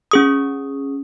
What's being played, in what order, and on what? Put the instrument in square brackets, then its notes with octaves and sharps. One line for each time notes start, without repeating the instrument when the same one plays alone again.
[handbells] C#4 G#4 D#6